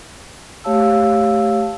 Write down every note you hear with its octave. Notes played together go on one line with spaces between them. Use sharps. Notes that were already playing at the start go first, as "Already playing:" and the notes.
A3 G4 C#5 F5 A5 E6